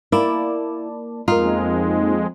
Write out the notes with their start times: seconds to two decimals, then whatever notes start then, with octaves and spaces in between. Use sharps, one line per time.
0.12 A#3 E4 D5 A5
1.28 F2 G#3 A#3 D#4 F4